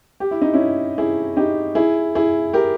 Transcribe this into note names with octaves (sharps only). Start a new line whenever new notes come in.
G4
E4
D#4
C#4 E4
E4 G#4
D#4 G4
E4 G#4
E4 G#4
G4 A#4